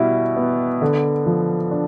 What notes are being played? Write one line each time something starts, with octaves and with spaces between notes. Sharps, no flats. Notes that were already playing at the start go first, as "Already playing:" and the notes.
Already playing: B2 G3 E4
B3
D3
F3
D4